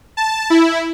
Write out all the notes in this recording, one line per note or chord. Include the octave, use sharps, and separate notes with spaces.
A5
E4